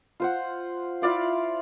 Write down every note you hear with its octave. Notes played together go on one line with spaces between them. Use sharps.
F4 C5 F#5
E4 F4 D5 F5